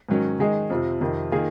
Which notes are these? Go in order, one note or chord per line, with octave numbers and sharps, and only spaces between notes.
G#2 D#3 F#3 C#4
D#3 G#3 D#4 G#4
F2 C3 F3
F2 C3 D#3
D#3 A#3 F4 G#4